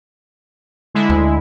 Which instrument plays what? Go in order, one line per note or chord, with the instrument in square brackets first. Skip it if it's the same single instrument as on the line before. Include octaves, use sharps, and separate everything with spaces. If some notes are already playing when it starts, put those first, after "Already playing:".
[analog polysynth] D3 G#3 E4
[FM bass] D2